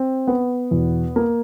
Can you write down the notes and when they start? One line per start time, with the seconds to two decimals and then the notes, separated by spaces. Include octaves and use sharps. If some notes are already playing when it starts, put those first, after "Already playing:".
Already playing: C4
0.28 B3
0.71 E2 B2
1.16 A#3